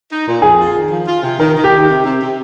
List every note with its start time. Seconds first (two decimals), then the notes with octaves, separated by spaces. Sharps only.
0.10 D#4
0.26 A#2
0.42 F2 G#4
0.58 F4
0.75 D#3
0.91 F3
1.07 F4
1.23 C3
1.39 D#3 A#4
1.55 D#3
1.64 G4
1.72 D#3
1.88 C3
2.04 C3
2.21 C3